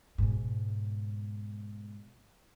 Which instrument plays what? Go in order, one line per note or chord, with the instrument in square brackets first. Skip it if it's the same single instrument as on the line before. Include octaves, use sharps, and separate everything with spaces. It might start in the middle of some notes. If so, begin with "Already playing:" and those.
[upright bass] G#2 B2